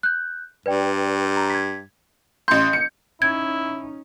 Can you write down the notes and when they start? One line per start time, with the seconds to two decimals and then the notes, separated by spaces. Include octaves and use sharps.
0.03 F#6 G6
0.66 G2 B4 D5 G5
1.36 A#5
1.50 G#6 B6
2.48 A1 C6 G6
2.73 C#7
3.22 C#4 D#4 E4 G#6